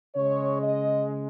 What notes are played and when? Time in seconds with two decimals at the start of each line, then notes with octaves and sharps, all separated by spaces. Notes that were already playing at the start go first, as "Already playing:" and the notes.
0.15 C#3 G#3 C#5
0.61 D#5